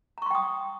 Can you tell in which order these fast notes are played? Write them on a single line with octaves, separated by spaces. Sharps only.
A#5 C#6 C6 G5 D#6